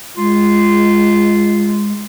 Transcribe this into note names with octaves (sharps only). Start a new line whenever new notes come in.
G#3 F4